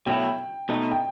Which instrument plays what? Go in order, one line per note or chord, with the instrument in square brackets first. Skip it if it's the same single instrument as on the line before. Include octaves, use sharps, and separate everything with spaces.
[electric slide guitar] B2 F#3 A3 E4 [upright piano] G5
[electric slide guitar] B2 A3 D#4
[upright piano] G5